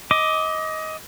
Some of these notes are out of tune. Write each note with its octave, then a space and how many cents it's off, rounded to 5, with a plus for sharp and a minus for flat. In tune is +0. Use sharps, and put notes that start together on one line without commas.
D#5 +20 D6 +0